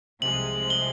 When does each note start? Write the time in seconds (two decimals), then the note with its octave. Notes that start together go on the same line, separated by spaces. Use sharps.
0.22 C2 C3 F3 G#3 F#7
0.70 G7